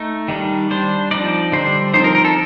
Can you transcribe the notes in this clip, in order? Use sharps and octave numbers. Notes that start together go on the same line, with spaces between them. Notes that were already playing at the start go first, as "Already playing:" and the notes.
Already playing: A3 D#4
D#3 G3 D4
G3 D4 C5
F3 C4 D#4 D5
D3 G3 D4 C5
F3 C4 D#4 C5
A#4
A#4
A4